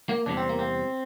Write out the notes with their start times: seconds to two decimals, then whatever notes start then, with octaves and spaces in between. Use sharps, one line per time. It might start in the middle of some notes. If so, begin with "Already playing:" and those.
0.09 A#3
0.26 E2 C3 G3 D4
0.37 C4
0.49 A#3
0.59 C4